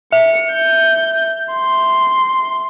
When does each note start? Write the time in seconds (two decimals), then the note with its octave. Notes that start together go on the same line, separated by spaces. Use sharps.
0.12 E5 C#7
0.52 G6
1.53 C6